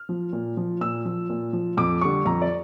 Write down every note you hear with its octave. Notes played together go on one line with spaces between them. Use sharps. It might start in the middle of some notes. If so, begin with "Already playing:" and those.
Already playing: F6
F3
A#2
F3
A#2 E6
F3
A#2
F3
F2 D6
D3 G3 C#6
F2 A#5
D5